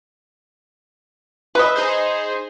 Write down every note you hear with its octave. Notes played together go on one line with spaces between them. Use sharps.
B4 D#5 E5
D#4 G#4 C5